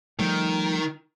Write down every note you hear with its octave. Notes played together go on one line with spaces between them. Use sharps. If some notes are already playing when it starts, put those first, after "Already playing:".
D#3 F3 G3 A3